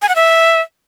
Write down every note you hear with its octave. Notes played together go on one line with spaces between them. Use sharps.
G#5
F#5
E5